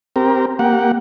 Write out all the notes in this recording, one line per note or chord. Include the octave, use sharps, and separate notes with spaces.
C4 G4 A#4
A#3 G4 F#5